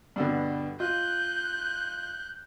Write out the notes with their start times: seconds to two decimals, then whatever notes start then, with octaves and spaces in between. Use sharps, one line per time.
0.16 G2 B2 D3
0.80 F4 D#5 F#6 G6